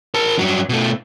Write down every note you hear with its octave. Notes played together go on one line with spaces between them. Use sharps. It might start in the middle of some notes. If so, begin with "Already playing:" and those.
A#4 A5
G2 F#3
B2 A3